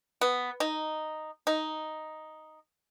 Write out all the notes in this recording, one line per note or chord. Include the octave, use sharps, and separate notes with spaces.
B3
D#4
D#4